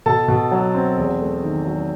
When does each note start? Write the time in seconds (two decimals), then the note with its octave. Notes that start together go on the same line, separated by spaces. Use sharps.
0.06 B2 A4 A5
0.28 B2
0.51 F#3
0.75 C4
0.98 E2
1.20 A3
1.43 D#3
1.66 F#3